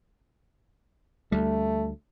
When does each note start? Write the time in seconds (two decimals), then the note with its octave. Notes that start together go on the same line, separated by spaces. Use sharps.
1.32 D2 G3 A3